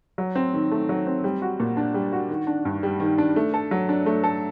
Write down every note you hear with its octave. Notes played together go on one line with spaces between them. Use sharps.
F#3
C4
D#3
A3
F#3
C4
G3
F#4
A#2
D4
G3
F#4
D#3
D4
G2
G3
D#3
D4
A3
A4
F#3
D4
A3
A4